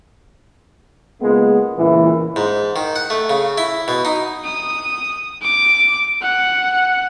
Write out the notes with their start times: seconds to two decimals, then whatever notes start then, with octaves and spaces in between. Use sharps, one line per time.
1.21 C#2 G#3 A#3 B3
1.77 C#2 A#2 E3
2.36 G#2
2.76 D#3
2.96 F#5
3.10 A3
3.30 C#3
3.58 E4
3.88 B2
4.05 D#4
4.44 D#6
5.42 D6
6.22 F#5